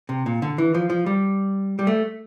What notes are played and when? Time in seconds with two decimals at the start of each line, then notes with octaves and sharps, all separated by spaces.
0.09 C3
0.26 A#2
0.42 D3
0.58 E3
0.74 F3
0.90 F3
1.06 G3
1.79 G3
1.87 A3